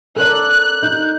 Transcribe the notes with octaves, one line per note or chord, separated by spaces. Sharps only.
A4 A#4 D5 F#6
D#4 G6